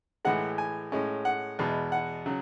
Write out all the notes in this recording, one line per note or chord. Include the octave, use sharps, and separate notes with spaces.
A2 E3 G#3 F#5
G#5
A2 G#3 C#4
F#5
E2 B2 G#3
F#5
C#3 F#3